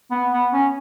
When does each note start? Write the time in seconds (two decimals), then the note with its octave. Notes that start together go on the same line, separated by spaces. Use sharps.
0.11 B3
0.31 B3
0.53 C#4